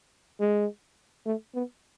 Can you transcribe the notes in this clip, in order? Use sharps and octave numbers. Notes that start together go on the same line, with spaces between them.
G#3
A3
B3